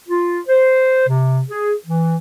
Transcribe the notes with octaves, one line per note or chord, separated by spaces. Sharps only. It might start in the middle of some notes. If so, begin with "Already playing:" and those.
F4
C5
C3
G#4
E3